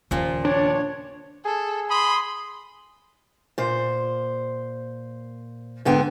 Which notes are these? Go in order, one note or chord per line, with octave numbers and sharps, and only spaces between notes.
D#2 A#2 C#3 F3
D4 C#5
G#4 A4
B5 C6 D#6
A#2 C5
G#2 D3 B3 G5